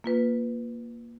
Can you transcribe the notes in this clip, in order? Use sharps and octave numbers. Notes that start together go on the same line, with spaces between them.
A#3 F4 B4